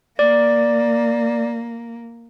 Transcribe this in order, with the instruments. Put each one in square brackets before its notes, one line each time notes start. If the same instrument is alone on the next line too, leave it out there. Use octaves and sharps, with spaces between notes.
[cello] A#3 [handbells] D5